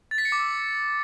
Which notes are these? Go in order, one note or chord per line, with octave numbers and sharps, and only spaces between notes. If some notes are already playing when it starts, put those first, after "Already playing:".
A6
B6
C#7
D6
E6